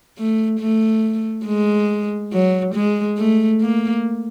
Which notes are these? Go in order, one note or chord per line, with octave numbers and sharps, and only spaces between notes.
A3
A3
G#3
F#3
G#3
A3
A#3